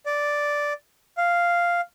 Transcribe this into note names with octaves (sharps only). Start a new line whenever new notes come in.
D5
F5